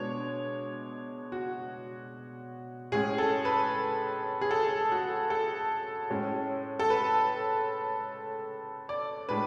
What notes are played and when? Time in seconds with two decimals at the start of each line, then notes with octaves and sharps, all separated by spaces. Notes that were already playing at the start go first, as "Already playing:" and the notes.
Already playing: B2 G#3 B3 D4 C#5
1.32 F#4
2.92 A2 G#3 C#4 G#4
3.18 A4
3.45 B4
4.41 G#4
4.51 A4
4.92 F#4
5.30 A4
6.10 A2 G#3 C#4
6.79 A4
6.90 B4
8.89 D5
9.29 A2 G#3 D4 B4